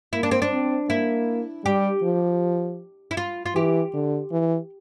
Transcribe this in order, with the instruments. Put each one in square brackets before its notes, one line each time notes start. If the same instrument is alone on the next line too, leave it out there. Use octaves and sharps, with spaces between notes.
[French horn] A#3 [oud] E4
[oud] D4
C4
D4
[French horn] C4
[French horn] A#3 [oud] E4
[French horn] G3 [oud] G4
[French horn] F3
[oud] E4
F4
F4
[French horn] E3 [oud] G4
[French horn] D3
E3